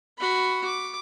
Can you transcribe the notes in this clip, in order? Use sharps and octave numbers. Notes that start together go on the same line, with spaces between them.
F#4 B5
D6